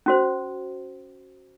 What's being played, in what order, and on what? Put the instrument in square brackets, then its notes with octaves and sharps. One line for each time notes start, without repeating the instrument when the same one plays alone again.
[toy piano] C#4 F#4 C5